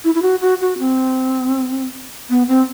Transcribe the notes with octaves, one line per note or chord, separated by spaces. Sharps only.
E4
E4
F#4
F#4
F#4
C4
B3
C4